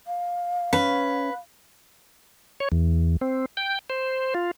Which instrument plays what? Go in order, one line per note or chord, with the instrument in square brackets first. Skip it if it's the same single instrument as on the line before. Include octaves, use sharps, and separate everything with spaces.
[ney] F5
[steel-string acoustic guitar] C#4 C#5 [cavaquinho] B4
[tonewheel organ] C#5
E2
C4
G5
C5
F4